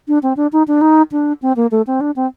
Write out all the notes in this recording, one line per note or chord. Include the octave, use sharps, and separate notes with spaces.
D4
C4
D4
D#4
D4
D#4
D4
C4
A#3
A3
C4
D4
C4